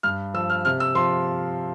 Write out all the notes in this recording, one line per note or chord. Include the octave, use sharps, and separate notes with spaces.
G2 F6
F3 E6
F6
C3 F6
E6
F3 C6